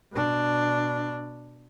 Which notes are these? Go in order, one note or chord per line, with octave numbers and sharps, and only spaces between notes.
B2 D4